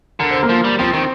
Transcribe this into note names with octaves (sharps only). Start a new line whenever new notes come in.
D3 A#4
C5
A#3 A#4
F3
G3
F3 C4 C5
D#3